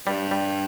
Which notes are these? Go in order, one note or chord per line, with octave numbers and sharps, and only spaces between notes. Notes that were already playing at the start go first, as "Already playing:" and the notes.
G2 G3
G3